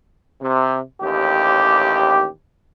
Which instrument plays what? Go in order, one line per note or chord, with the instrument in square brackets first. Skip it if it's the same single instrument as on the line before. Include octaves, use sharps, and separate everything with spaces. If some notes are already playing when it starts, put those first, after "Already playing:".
[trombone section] C3
A1 D#2 G4